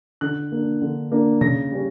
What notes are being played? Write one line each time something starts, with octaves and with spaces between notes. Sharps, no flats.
D3 F#6
A#3 D4
D3
A#3 D4
C#3 A#6
G3 C#4